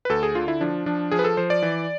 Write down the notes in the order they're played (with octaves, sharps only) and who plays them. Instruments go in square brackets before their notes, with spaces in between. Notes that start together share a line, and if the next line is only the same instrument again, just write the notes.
[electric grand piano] B4
D2 A4
G#4
D3 F4
E4
F3 D4
F3 D4
F3 G#4
B4
A4
F3 C5
D5
E3